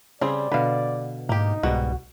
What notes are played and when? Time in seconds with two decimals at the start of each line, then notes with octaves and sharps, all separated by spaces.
0.21 C#3 G3 C4 G#4 D5
0.52 B2 D3 B4 F5
1.29 G#2 A#3 D#4 G4
1.63 C2 G#2 B2 G3 F#4